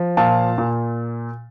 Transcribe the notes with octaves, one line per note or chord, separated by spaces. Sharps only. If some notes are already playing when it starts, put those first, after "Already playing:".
Already playing: F3
A#2 F5 A5
A#2